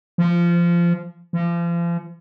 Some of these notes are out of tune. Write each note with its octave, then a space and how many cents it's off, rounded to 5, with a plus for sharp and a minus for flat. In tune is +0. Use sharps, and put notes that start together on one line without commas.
F3 -20
F3 -40